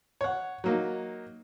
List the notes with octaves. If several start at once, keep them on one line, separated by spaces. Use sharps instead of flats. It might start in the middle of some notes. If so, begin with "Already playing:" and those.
C#5 F#5
F#3 A#3 D#4